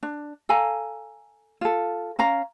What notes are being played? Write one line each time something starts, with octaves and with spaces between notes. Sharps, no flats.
D4
A4 F5 G#5 A#5
F4 A4
C#4 F5 A#5